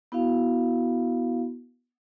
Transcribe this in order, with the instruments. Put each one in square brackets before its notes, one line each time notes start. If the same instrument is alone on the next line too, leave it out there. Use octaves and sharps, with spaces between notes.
[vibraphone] B3 E4 F#4 F5